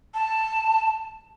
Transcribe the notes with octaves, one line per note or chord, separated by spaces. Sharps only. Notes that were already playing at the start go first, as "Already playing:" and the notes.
A5